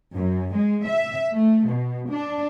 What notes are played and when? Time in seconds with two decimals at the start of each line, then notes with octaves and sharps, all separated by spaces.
0.15 F#2
0.55 G#3
0.88 E5
1.34 A3
1.67 B2
2.11 D4